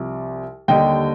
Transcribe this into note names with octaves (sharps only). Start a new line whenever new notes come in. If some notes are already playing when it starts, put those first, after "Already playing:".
Already playing: C2 C3 F3
D#2 D3 G3 D#5 G5